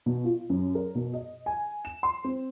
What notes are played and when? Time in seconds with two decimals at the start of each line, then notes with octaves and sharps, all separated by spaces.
0.06 B2
0.25 F4
0.50 F#2
0.75 A#4
0.95 B2
1.13 D#5
1.46 G#5
1.85 E7
2.03 C6
2.24 C4